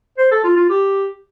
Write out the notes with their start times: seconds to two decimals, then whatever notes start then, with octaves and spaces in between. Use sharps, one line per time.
0.18 C5
0.31 A4
0.44 F4
0.56 F4
0.69 G4